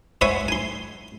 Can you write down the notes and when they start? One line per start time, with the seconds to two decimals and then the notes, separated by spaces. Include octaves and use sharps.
0.21 C5 C#5 E5 F#5 G#5 B5
0.48 G#5 C6